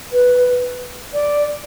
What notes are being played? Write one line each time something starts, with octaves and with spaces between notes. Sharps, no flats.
B4
D5